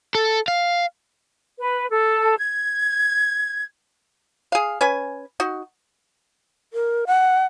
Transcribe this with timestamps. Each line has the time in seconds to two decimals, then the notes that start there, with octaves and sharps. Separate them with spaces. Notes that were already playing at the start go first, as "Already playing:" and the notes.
0.15 A4
0.48 F5
1.58 B4
1.89 A4
2.37 G#6
4.52 G#4 F5
4.81 C#4 B4 G#5
5.40 D#4 F#4
6.73 A#4
7.07 F#5